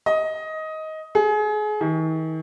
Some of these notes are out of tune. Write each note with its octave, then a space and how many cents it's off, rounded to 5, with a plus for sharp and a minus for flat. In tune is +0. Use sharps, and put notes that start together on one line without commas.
D#5 +15
G#4 +30
D#3 +45